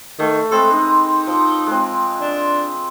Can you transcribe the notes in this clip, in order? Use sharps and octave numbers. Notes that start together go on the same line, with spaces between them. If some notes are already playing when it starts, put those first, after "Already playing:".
D#3 A3
G#3 C4 A4 B4
D#4
F3
G#3 C4
D4